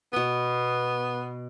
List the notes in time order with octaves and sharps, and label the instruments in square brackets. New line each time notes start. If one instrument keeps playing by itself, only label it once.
[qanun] B2 B5 [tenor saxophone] B3